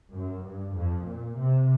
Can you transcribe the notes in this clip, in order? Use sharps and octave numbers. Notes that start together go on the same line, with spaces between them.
F#2
G2
F2
A#2
C3